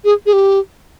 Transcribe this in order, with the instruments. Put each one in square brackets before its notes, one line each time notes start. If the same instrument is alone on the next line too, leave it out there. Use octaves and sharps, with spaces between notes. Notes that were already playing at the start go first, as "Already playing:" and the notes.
[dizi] G#4
G#4
G4